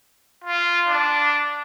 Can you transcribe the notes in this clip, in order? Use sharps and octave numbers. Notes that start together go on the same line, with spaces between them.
F4
D4